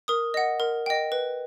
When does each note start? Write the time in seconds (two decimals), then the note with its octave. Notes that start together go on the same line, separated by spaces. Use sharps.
0.08 A#4 D#6
0.34 D#5 F#5
0.60 A#4
0.86 D#5 G5
1.12 B4